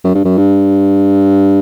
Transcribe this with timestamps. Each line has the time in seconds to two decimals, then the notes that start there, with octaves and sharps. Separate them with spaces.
0.04 F#2
0.15 G2
0.25 F#2
0.38 G2